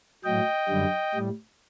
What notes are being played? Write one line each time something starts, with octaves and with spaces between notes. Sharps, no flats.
A2 F#3 D#5 G5
F#2 D3 G3
A2 G3